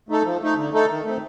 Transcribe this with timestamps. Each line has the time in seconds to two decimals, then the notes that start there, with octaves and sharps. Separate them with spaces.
0.09 A3 D#4 A4
0.25 F3
0.41 A3 D#4
0.57 D3
0.72 A3 D#4 A4
0.89 D#3
1.05 A3 C4